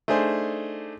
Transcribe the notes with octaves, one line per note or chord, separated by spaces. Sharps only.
A3 D4 D#4 G#4 C5